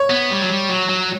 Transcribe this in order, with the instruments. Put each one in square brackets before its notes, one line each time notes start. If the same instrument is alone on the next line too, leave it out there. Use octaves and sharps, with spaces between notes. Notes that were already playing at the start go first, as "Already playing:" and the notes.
Already playing: [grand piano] C#5
[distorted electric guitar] B3
G3
F#3
G3
F#3
F#3